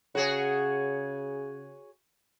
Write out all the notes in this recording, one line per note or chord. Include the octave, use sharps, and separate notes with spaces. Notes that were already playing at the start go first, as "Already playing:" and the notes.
C#3 F#4 G#4 C#5